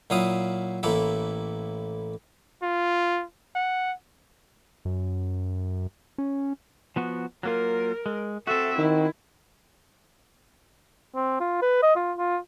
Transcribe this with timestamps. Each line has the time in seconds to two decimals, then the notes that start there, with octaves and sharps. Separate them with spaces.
0.10 A#2 F#3 E4 F5 D#6
0.83 A1 A2 A#3 E4 A4
2.62 F4
3.55 F#5
4.85 F#2
6.18 C#4
6.96 F3 B3 F#4
7.43 F#3 A#3 F4 A#4
8.06 G#3
8.47 C4 F#4 A4 E5
8.78 D#3 E4
11.15 C4
11.40 F4
11.62 B4
11.82 D#5
11.96 F4
12.18 F4